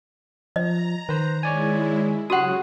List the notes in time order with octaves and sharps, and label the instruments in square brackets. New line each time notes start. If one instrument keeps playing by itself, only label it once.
[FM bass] F3 [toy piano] D#5 [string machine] A#5
[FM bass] D#3 [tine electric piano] B4 C5
[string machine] G#3 E4 [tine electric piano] C#5 D5 G#5
[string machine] C#3 F#3 [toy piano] F#4 G4 F#5 [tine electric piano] D#6 F#6